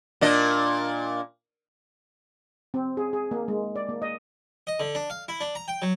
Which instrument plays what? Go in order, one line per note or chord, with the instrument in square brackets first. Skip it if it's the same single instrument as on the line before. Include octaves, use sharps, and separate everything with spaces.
[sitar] A#2 D4 D#5
[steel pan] C4
G#4
G#4
A#3
G#3
D5
A#3
D#5
[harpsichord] D#5
D3
D4
F5
E4
D4
A#5
G5
F#3